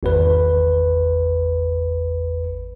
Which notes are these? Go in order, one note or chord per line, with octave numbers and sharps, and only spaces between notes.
G#1 E2 B4